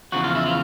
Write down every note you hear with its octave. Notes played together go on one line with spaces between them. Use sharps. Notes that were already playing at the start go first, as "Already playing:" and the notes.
E2 C#3 F3 F#4
F4
E4
F4